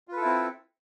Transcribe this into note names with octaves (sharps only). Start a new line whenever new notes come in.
C4 E4 F4 A4 B4